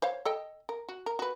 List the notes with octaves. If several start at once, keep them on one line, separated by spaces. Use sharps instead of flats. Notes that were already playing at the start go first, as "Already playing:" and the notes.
C5 C#5 F5
A4 D#5 G5
A#4
F#4
A#4
F#4 B4